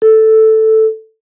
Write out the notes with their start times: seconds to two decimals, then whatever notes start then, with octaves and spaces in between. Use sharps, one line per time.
0.02 A4